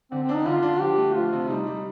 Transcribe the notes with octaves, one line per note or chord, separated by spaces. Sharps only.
D3 C4
C4
D4
D#4
D3 F4
D4
F3 G4
A3
F3 F4
C3
G3 D#4
G3